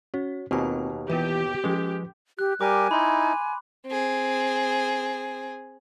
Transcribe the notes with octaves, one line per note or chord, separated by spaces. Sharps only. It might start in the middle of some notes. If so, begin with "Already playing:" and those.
C#4 F#4 C#5
D#2 B2 A#3 C4 F4 G4 G#5
E3 B3 E4 F4 G4 B4
F3 G#3 C#4 A4 B4
G4 F#6
G3 G4 A#4 G#5 D6
D#4 E4 B5 C6
C4 G#4